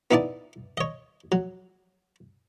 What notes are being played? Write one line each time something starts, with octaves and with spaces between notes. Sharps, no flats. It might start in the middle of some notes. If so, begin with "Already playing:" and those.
B3 D#4 E4 D5 A5
C#5 D#5
F#3